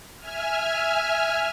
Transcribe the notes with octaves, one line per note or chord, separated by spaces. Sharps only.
E5 G#5 F6